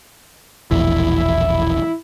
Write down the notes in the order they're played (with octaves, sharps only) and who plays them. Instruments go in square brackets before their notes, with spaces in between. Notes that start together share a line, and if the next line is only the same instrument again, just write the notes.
[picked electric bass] E1 A#1 E2 [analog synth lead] E4